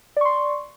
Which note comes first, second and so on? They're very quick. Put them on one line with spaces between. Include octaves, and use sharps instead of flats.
D5 C#6 C6